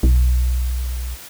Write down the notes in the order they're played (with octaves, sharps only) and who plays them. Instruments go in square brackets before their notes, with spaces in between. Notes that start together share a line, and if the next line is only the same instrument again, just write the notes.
[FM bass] B1